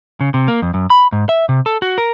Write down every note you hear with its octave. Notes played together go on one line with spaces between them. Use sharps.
C#3
C3
A#3
F2
F#2
B5
G#2
E5
C3
A4
F#4
A#4